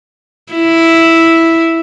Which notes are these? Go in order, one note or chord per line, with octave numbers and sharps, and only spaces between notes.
E4